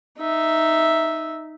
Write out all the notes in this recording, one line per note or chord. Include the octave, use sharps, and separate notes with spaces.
D#4 E5